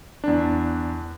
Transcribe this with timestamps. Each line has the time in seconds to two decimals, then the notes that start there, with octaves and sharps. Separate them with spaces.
0.24 E2 D4